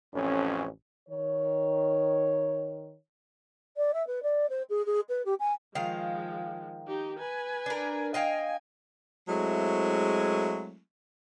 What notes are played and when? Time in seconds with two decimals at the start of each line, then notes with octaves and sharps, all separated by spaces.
0.13 A1 F2 C#4
1.09 D#3 C#5
3.77 D5
3.93 E5
4.07 B4
4.23 D5
4.49 C5
4.69 G#4
4.86 G#4
5.09 B4
5.25 G4
5.39 G#5
5.75 D#3 F3 G#3 F5
6.87 D#4 G4
7.19 B4 G#5
7.66 D4 A#4
8.14 D#5 F5 G5 G#5
9.28 F#3 G#3 A3 C4 E4